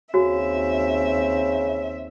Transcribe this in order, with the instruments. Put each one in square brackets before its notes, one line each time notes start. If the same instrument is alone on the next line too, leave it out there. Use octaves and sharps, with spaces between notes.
[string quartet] D#2 C4 E5 [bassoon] C#3 [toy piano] F#4